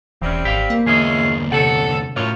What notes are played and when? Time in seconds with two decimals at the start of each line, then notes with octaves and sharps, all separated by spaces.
0.22 E1 E3 G3 C4 C#4
0.45 G#1 G4 F5
0.70 A#3
0.86 E2 D3 C#4 E4 F4 G#4 D#5
1.52 C3 A4 C#5 F#5
2.16 F#2 A2 F4 C#5